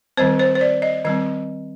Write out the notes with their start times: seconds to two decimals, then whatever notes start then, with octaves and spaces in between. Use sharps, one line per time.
0.17 D#3 G3 C4 C5
0.39 C5
0.55 C5
0.61 D5
0.82 D#5
1.05 D#3 G3 C4 D#5